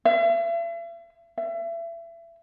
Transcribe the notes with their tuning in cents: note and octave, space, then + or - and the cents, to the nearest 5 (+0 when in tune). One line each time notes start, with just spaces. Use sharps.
E5 +45
E5 +30